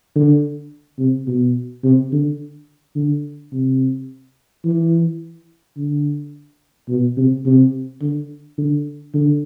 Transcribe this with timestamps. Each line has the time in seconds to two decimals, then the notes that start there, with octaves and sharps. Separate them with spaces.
0.16 D3
0.99 C3
1.27 B2
1.84 C3
2.12 D3
2.95 D3
3.53 C3
4.64 E3
5.77 D3
6.89 B2
7.17 C3
7.46 C3
8.02 D3
8.58 D3
9.14 D3